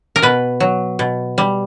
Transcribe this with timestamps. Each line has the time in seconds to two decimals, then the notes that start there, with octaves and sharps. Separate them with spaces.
0.16 A#4
0.22 B2 B4
0.60 F#3
0.99 B2
1.38 G3